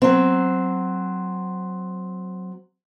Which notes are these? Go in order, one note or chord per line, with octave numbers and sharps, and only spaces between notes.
F#3 C4